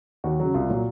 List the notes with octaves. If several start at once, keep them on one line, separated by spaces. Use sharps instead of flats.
D#2 F#4
C#3 F#3
C2 F4
A#2 F#3